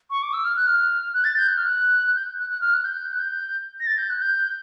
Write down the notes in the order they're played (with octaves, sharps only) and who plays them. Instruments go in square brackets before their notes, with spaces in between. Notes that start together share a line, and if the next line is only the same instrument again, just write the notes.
[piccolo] C#6
D6
E6
F6
F#6
F6
F#6
A6
G6
F#6
F6
F#6
F#6
G6
F#6
F#6
F6
F#6
G6
F#6
G6
A#6
A6
G6
F#6
G6